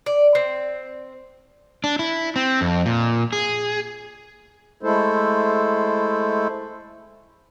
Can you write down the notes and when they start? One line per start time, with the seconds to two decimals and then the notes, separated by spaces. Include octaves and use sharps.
0.06 D5
0.35 C4
1.84 D4
1.99 E4
2.36 C4
2.61 F2
2.86 A#2
3.33 G#4
4.83 G#3 A3 E4 A4 C5